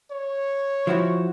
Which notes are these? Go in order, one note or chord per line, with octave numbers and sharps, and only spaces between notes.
C#5
F3 E4 F#4